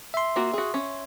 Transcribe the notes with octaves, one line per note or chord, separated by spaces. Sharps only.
E5 C6
A#3 F4 F#4
F#4 G#4
C#4